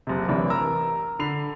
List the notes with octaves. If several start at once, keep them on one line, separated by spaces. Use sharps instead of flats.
F#1 C3
A1 C3 E3 D4 E4
A#4 A#5 E6
D3 B5 C7 F7